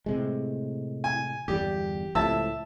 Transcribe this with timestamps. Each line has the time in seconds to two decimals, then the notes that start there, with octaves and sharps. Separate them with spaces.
0.06 A2 C3 G#3
1.04 G#5
1.48 G1 E2 G3 G4
2.15 C#2 A2 F3 E5 A5 E6